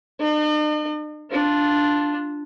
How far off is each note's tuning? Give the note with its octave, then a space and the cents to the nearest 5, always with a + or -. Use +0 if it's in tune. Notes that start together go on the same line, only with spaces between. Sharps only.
D4 +45 D#5 -45
D4 +0 F4 +0